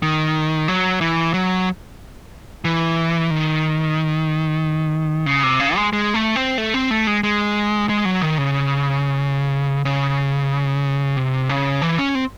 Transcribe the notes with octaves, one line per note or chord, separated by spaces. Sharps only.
D#3
F#3
E3
F#3
E3
D#3
C#3
C3
C#3
G#3
G#3
A3
C4
A3
C4
A3
G#3
G#3
G#3
F#3
D#3
C#3
C#3
C3
C#3
E3
C#4
C4